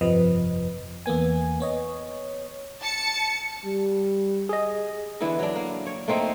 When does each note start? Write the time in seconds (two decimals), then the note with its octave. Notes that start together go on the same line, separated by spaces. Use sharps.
0.01 G1 F2 C3 F3 B4 D#5
1.06 E2 A#3 B3 G#5
1.60 B3 C#5 D#5
2.82 A5 C#7
3.65 G3
4.49 G#4 D#5
5.21 D3 E3 B3 E4
5.39 F#3 D4
5.55 A#3
5.86 C#5
6.08 A3 A#3 C4 D#4